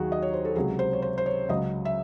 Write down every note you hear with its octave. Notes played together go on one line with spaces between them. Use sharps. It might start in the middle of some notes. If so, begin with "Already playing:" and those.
Already playing: D#2 D#3 F#3 F#4 G#4
D#5
C#5
C5
A4
C#2 C3 F#3 G#4
C5
C#5
C5
C5
C#5
C#2 C#3 F#3 D#5
E5